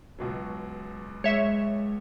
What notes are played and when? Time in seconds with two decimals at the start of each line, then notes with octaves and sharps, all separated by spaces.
0.19 C#2 B2 F#3
1.24 G#3 C#5 E5